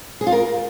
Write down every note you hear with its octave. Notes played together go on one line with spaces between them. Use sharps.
G#4
F4
A#4